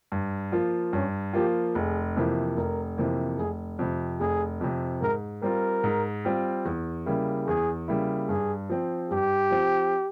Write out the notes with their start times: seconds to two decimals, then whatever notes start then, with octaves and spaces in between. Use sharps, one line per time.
0.12 G2
0.52 F3 A#3 F4
0.93 G2 C#4
1.33 F3 A#3 F4 G4
1.75 F1 G#4
2.16 F2 C3 E3 A#3
2.57 F1 A#4
2.98 F2 C3 E3 A#3
3.38 F1 G#4
3.79 F2 C3
4.20 F1 G#4
4.61 F2 C3
5.02 G#2 A#4
5.42 G3 C4 F4 A#4
5.84 G#2
6.25 G3 C4 F4
6.65 E2
7.06 C#3 G3 A#3 E4
7.46 E2 G#4
7.88 C#3 G3 A#3 E4
8.29 G2 G#4
8.70 F3 C4
9.11 G2 G4
9.51 F3 C4